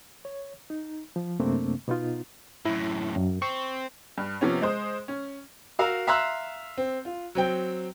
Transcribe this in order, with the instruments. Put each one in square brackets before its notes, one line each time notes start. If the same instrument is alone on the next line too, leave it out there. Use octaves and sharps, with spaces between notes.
[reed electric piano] C#5
D#4
F3
F#2 C3 A3 A#3 C4 D4
B2 B3 D#4 F4
[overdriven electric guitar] F#2 A2 [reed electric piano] E4
[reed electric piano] F#2
[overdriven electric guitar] C4 [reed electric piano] C#6
[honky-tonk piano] G2
C3 F3 B3 C#4
G#3 C5 D#6
C#4
[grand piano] F#4 A#4 F5 E6
E5 F5 A#5 C6 E6 F#6
C4
F4
F#3 C4 G5